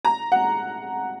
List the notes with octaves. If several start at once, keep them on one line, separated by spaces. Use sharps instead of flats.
A#5
F#5